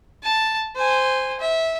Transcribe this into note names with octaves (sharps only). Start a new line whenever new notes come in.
A5
C5 G#5
E5